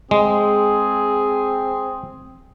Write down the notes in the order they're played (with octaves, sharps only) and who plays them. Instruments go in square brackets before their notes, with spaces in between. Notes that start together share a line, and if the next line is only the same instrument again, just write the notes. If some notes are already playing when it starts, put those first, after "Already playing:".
[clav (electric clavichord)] G#3 [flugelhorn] C4 [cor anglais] G#4